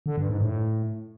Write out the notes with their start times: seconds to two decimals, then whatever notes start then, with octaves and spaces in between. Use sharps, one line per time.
0.06 D3
0.18 G2
0.30 G#2
0.41 A2